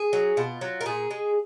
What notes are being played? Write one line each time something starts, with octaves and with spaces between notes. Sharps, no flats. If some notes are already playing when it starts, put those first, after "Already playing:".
Already playing: G#4
F#3
B2 F4
F#3
A#4
A#2 G#4
G#3